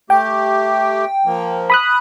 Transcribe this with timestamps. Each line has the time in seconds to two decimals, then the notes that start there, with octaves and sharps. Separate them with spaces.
0.10 A3 G4 G5
1.26 F3 A#3
1.70 B5 D#6 F#6